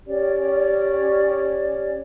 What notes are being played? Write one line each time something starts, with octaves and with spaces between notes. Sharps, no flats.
C#4 G4 C#5 D5